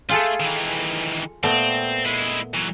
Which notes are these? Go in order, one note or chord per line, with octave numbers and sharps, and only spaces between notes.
A3 F4 G#4 A4
D#3 E3
A#2 A3 B3 C4
G#3 E4
E3 F#3